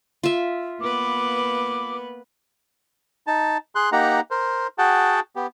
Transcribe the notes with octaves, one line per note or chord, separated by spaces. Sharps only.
F4 E5
A#3 B3 B4 D6
D#4 A5
G#4 C6 F#6
A#3 D#4 G4 F#5 A#5
A#4 C5
F#4 G#4 F#5 G5 A5
B3 G4